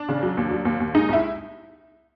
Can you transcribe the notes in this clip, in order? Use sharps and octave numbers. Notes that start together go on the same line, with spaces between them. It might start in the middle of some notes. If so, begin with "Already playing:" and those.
Already playing: D4
C#3
F#3
D#2
F#3
D#2
D#2
G#3 D#4
C2 E4